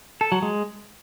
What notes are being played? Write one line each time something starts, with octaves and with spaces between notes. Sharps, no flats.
A4
F#3
G#3